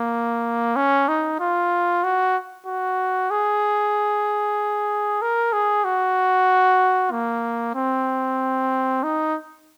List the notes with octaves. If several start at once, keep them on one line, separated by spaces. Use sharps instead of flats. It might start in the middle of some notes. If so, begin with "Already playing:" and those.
Already playing: A#3
C#4
D#4
F4
F#4
F#4
G#4
A#4
G#4
F#4
A#3
C4
D#4